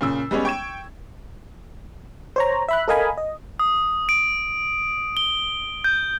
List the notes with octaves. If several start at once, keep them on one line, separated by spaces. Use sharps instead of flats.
A#2 C#3 E6
G3 G#3 B3 C#4 C#5
G5 C#6 G#6 E7
C5 C#5 A#5
E5 B5 F#6
A4 A#4 D#5 F5 G#5 B5
D#5
D#6
D7
G7
G6